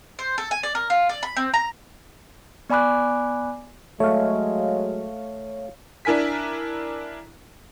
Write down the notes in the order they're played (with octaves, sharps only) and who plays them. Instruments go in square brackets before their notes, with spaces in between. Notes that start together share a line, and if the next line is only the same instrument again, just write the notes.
[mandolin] C5
A4
G#5
D5
A#4
F4
D5
B5
C4
A#5
[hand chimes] B3 D5 G#5 B5 D6 F#6
[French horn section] F#3 G#3 [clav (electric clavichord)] A3 [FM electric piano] C#5 F5
[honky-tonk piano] D4 E4 A#4 G#5 B6